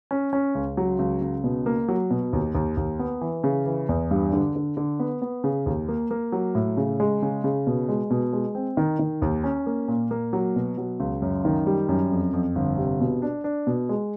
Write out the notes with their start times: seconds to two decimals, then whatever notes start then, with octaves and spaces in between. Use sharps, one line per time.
0.11 C#4
0.33 C#4
0.55 C#2
0.77 F#3
0.99 C#2
1.21 C#2
1.44 B2
1.66 A#3
1.88 F#3
2.10 B2
2.33 D#2
2.55 D#2
2.77 D#2
2.99 B3
3.21 E3
3.44 C#3
3.66 E3
3.89 E2
4.11 G2
4.33 D3
4.56 D3
4.77 D3
5.00 B3
5.22 B3
5.44 C#3
5.66 D#2
5.88 A#3
6.11 A#3
6.32 F#3
6.55 A2
6.77 C#3
7.00 G#3
7.22 C#3
7.44 C#3
7.67 B2
7.89 G#3
8.10 B2
8.33 G#3
8.55 C4
8.77 D#3
8.99 D#3
9.22 D#2
9.44 C#4
9.66 A#3
9.88 A#2
10.11 A#3
10.33 F#3
10.56 B2
10.78 F#3
11.00 C#2
11.22 F#2
11.45 D#3
11.66 G3
11.89 F#2
12.11 F2
12.33 F2
12.55 G1
12.77 C3
13.00 B2
13.22 D4
13.44 D4
13.67 B2
13.89 G#3